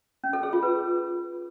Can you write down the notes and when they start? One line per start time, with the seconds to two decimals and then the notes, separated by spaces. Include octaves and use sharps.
0.24 C#4
0.33 A4
0.43 G#4
0.53 F4
0.63 B4